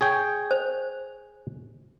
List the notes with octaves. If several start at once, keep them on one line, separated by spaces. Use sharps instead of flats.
G#4 C#5 G5
C5